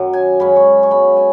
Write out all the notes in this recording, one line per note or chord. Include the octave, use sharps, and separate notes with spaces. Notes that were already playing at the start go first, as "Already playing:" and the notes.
Already playing: F#2 D#3 F#3
G#5
F#2 C#3 G#3 C#4 B5
C#6
C#6
F#2 C#3 G#3 B3 B5
G#5